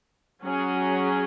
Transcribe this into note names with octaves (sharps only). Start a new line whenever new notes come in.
F#3 C#4 G#4